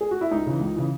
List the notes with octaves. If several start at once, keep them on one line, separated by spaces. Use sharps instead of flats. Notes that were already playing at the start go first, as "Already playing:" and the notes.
G#4
F#4
E4
C#2 D#4
C#3 E3
C#2
C#3 E3